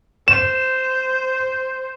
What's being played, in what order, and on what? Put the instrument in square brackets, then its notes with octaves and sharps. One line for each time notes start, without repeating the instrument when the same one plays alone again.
[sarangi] C5 [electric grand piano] E7